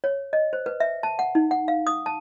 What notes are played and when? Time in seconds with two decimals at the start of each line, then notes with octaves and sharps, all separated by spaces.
0.04 C#5
0.33 D#5
0.53 C5
0.66 B4
0.80 E5
1.03 A5
1.19 F#5
1.35 D#4
1.51 F#5
1.68 F5
1.87 D#6
2.06 A5